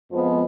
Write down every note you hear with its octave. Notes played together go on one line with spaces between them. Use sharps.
F2 F3 G#3 B3